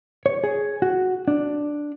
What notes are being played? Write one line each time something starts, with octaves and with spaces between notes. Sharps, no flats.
C#5
G#4
F#4
D4